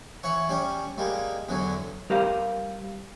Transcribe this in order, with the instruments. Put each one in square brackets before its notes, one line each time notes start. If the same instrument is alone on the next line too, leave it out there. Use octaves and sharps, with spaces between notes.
[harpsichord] E3 C#5 F#5
G3 C#4 D4
G3 G#3 A#3
E2 D3 E3 F#3
[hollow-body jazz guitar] G3 G4 A#4 C5 F5